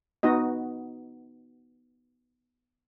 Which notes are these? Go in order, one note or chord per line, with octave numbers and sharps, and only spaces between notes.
B3 D#4 F#4 D#5